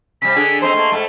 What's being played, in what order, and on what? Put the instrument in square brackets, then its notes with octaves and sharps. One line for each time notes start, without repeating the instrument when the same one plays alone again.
[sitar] C3 G3 [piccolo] B6
[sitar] D3 D4 G#4
[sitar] C4 D#4 C5 [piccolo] C6
[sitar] A3 A#3
G#2 A3